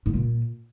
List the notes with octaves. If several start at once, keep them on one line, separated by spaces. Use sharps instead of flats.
G#2
A#2